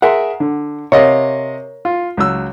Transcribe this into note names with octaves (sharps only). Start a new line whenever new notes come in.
G#4 A#4 E5 F#5 C6
D3
C3 A#4 C#5 D#5 F5
F4
C#2 F#3 E6